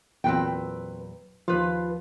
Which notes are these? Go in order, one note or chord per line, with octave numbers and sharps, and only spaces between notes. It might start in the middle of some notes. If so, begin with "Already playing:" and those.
E2 A#2 F#3 C4 B4 G5
D#2 F3 F4 B4